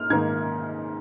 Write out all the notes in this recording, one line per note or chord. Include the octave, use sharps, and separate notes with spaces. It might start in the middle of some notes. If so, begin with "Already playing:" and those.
Already playing: G#2 A#3 F6
G#2 D#3 A#3 D#4 G#6